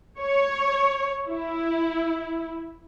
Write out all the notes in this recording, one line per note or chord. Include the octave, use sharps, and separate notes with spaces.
C#5
E4